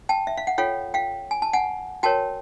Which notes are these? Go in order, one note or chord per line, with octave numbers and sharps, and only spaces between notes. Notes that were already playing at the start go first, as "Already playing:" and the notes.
G5 A5
E5
F5
F#5
F4 A4 C#5 F5 G5
F5 G5
G#5
A5
F#5 G#5
F#4 A#4 C#5 G5 A5